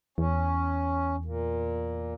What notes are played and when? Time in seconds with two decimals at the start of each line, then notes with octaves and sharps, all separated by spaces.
0.18 E2 C#4
1.25 A#2